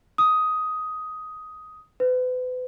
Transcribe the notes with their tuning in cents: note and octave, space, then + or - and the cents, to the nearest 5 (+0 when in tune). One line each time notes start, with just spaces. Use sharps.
D#6 +10
B4 +40